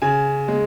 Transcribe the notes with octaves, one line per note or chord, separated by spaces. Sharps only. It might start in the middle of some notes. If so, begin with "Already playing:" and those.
C#3 G#5
G#3